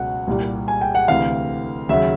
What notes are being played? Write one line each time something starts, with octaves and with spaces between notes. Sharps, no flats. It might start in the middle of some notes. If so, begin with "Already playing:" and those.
Already playing: C#2 B2 F#3 F#5
C2 A#2 G3
G#5
G5
F#5
D2 C3 E3 F5
D#2 C#3 F#3 E5